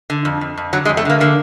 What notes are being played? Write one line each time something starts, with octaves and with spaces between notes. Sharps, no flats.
D3
F2
F2
F2
D3 F#3
G#3
F2
A3
D3 A#3
D3 A#3